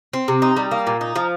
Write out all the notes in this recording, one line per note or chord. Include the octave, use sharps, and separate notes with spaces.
C4
C3
D#4
G3
A#3
A#2
D#4
F3